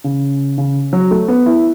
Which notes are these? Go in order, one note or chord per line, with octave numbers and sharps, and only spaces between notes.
C#3
C#3
F#3
A3
B3
E4